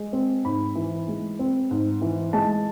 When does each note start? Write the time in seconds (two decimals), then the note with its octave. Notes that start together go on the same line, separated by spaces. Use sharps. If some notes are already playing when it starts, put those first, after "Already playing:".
Already playing: G#3
0.13 C4
0.45 G#2 B5
0.75 E3
1.08 G#3
1.39 C4
1.71 G#2
2.02 E3
2.33 G#3 A5